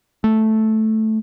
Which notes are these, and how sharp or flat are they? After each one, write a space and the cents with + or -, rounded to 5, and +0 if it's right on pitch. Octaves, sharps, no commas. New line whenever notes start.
A3 -5